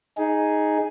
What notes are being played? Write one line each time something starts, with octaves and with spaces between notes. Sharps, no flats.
D#4 G#4